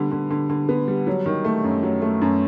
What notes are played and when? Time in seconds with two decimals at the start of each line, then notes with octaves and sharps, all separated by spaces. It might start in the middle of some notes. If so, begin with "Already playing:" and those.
Already playing: D3 G3 B3
0.11 D3
0.30 D3
0.49 D3
0.69 B3
0.88 G3
1.07 F#3
1.26 D#3
1.44 A3
1.64 F#2
1.83 F#3
2.02 A3
2.22 F#2